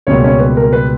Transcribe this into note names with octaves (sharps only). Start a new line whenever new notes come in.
C#2 B2 G3 A#3 C#4 C#5
C#4 C#5
B4
A#4
B4